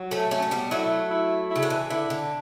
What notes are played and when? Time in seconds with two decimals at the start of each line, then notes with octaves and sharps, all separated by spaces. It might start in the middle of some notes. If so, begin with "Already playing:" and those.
Already playing: F#3
0.11 A3 C#4
0.31 A3 C#4
0.42 C#4
0.51 G3 B3
0.71 F#3 A3 E4
1.11 E4
1.51 C#3 E4
1.63 D3
1.70 E3
1.90 D3 E4
2.10 D3